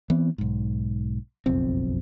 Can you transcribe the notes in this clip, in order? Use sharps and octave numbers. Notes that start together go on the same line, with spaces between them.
E3 B3 C4
B1 G#2
F#1 B1 F2 C4